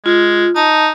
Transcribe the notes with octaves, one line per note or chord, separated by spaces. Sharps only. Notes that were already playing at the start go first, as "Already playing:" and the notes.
G#3 F4
D#4 A5